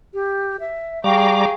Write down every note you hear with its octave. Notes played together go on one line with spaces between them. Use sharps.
G4
E5
G3 G#4 F5 G5 A#5 C#6 D6